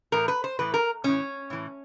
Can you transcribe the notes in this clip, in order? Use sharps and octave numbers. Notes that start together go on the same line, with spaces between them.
A2 E3 A#4
B4
C5
A2 E3 B4
A#4
A2 E3 C#4
A2 E3